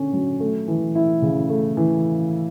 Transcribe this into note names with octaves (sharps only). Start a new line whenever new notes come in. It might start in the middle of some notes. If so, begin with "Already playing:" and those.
Already playing: D3 C#4
F#3
A3
E3
E4
C#3
A3
E3